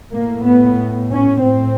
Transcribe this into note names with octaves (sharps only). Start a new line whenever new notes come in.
A2 A#3
B3
C#4
A2 C4